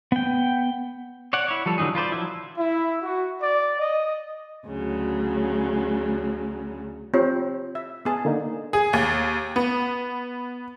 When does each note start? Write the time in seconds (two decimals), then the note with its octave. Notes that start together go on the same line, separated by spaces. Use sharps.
0.12 B3 G5
1.33 C#5 D5 F#5
1.48 E4 C#5
1.66 F3 G3 A4
1.78 D3 E3 F#3 D#4 G#4
1.95 F4 B4 C5 D5
2.12 F3 F#3 E4
2.58 E4
3.02 F#4
3.42 D5
3.80 D#5
4.66 D2 C#3 F#3
7.14 C4 F4 G4 C#5
7.75 E5
8.05 B3 G#4 A5
8.25 D3 A#3 D#4
8.73 G#4
8.93 D#2
9.56 B3